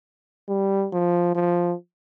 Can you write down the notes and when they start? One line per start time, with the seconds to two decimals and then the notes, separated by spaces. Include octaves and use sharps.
0.49 G3
0.93 F3
1.35 F3